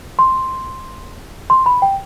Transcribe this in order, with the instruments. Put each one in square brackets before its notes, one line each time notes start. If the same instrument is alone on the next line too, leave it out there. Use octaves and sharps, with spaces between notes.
[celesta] C6
C6
B5
G5